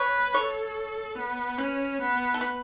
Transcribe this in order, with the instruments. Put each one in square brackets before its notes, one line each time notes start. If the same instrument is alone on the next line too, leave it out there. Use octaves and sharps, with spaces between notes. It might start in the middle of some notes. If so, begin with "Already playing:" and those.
Already playing: [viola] B4 [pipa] C#5
[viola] A4 [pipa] C#5
[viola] B3
[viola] C#4 [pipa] B4
[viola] B3
[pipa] A4
B4